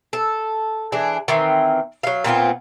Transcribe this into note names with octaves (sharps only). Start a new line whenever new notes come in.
A4
E3 D4 G#4
D#3 E3 C4
F#3 F5
A#2 B3 C4 F4